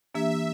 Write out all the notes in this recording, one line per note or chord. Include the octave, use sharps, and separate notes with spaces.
E3 A#3 D4 G4 E5
E5